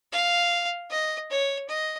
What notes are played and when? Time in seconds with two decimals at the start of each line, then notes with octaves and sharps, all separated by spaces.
0.12 F5
0.90 D#5
1.30 C#5
1.69 D#5